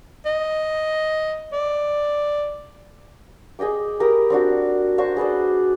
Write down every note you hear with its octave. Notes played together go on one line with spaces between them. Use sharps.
D#5
D5
G#4 D#5 G5 D6
G4 A#4 B5 D#6
C4 D4 F#4
D4 F#4 C5 C#6
G#4 B4 C5 D5